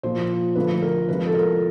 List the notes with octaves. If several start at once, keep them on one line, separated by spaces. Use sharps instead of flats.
A#2 F3 A#3 C5
D3 F3 A3 B4
A#4
C3 F3 G#3 B4
A4
A#4